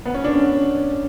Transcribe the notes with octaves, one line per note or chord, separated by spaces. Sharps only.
B3
C#4
D4
C#4